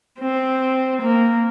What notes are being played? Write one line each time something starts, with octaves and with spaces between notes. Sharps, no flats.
C4
A#3